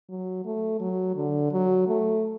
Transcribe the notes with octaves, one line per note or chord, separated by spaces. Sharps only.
F#3
A3
F#3
D3
F#3
A3